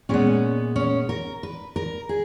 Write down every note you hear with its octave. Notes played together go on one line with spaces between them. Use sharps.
A#2 G#3 B3 C#4
C#4
A#4
B4
A#4
G#4